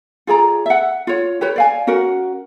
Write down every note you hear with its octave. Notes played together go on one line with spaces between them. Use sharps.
F4 G#4 D5 A#5
E5 F#5
F4 C#5
G4 B4 C#5
D5 F5 G#5
C#4 F#4 A#4 F#5